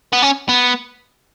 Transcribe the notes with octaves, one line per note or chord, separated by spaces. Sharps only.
B3
C#4
B3